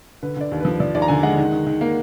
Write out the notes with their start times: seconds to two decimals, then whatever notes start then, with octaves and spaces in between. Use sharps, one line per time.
0.23 D3 B4
0.37 D3 D5
0.52 D#2
0.60 F3 B4
0.80 F3 D5
0.94 D#2 D5
1.02 A#5
1.08 D3 G#5
1.23 G#3 F#5
1.38 D#3
1.52 D#3
1.67 D#3
1.81 A#3